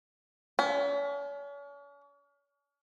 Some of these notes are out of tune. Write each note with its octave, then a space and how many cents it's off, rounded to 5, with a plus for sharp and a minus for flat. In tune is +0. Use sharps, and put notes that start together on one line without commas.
C#4 +40